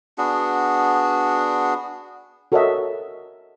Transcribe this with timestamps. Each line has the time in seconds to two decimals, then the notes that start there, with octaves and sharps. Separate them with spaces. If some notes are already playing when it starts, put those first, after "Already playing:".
0.18 B3 D4 F#4 G#4
2.52 F#4 A4 A#4 C#5 D#5 E5